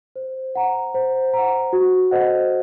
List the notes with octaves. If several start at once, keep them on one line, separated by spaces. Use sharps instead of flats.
C5
F#5 A#5
C5
F#5 A#5
F#4
A4 C5 D#5 F#5